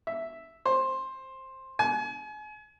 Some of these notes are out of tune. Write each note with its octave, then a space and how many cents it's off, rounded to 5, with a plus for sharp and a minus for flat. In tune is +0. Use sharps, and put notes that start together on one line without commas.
E5 +0
C5 +10
G#5 +35